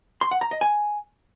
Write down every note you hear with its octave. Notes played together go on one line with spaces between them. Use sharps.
C6
F#5
A#5
D#5
G#5